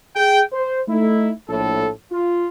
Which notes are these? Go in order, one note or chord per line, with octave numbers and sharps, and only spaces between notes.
G#4 G5
C5
A3 D#4 E4
A#1 A2 A4
F4